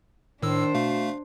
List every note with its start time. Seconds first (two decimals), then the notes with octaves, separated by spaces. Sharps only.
0.42 A2 D#3 D4 C5 E6
0.75 B2 A3 F5